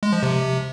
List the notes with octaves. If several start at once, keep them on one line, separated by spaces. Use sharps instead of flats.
G#3
F3
C3